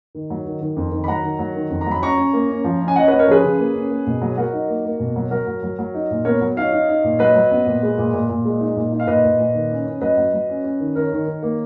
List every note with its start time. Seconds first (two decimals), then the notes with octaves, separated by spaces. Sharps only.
0.15 D#3
0.30 F#3
0.45 D#3
0.61 D#3
0.77 F2
0.92 D#3
1.04 B5
1.08 F#3 F#5 A#5
1.24 D#3
1.39 F#3
1.56 D#3
1.70 F2
1.81 A#5
1.86 F#3
1.91 B5
2.02 C#4 A#5 C#6
2.18 C#4
2.33 A#3
2.49 C#4
2.64 F3
2.81 C#4
2.88 G#5
2.96 C#4 D#5 F#5
3.02 C#5
3.08 C#4 B4 D#5
3.19 A#4 C#5
3.27 F3 G#4 B4
3.44 C#3
3.58 A#3
3.74 C#4
3.90 A#3
4.06 B2
4.22 F#3
4.37 F#3 F#4 A#4
4.53 D#4
4.68 A#3
4.85 A#3
5.00 B2
5.16 F#3
5.31 F#3 F#4 A#4
5.47 F#3
5.63 F#3
5.79 F#3
5.94 D#4
6.10 A#2
6.25 B3 A#4 C#5
6.41 F#3
6.57 D#4 C#5 F5
6.72 D#4
6.89 D#4
7.04 A#2
7.19 F#3 B4 D#5
7.36 F#3
7.51 B3
7.66 A#2
7.83 G#3
7.98 A#2
8.14 A#2
8.29 A#2
8.45 G#3
8.60 D#4
8.76 A#2
8.93 D#4
9.00 F5
9.07 A#2 B4 D#5
9.24 A#2
9.40 A#2
9.54 D#3
9.71 C#4
9.86 C#4
10.01 F#3 B4 D#5
10.17 F#3
10.33 F#3
10.49 C#4
10.64 C#4
10.80 D#3
10.95 D#3 A#4 C#5
11.12 D#3
11.27 D#3
11.43 A#3